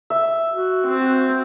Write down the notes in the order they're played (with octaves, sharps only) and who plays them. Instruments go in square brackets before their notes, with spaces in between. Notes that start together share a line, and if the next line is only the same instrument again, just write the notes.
[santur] E5
[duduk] F#4
[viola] C4